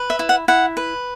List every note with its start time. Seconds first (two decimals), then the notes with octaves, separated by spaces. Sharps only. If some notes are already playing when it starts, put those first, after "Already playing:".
Already playing: B4
0.10 E5
0.19 E4
0.29 F#5
0.48 E4 F#5
0.77 B4